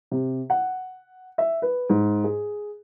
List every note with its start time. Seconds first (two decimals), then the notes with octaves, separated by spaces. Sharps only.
0.11 C3
0.50 F#5
1.38 E5
1.62 B4
1.90 G#2
2.24 G#4